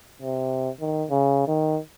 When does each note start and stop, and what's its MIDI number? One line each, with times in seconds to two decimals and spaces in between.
0.22 0.70 48
0.80 1.05 51
1.10 1.43 49
1.48 1.79 51